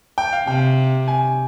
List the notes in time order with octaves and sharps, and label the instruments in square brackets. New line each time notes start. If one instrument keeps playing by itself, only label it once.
[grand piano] G5
F5
[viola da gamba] C3 [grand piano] G5
[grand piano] G#5